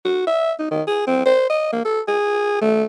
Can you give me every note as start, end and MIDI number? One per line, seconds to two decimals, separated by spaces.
0.05 0.27 66
0.27 0.52 76
0.59 0.68 63
0.71 0.82 51
0.87 1.04 68
1.07 1.25 60
1.26 1.45 72
1.50 1.69 75
1.72 1.84 58
1.85 2.01 69
2.08 2.57 68
2.61 2.84 57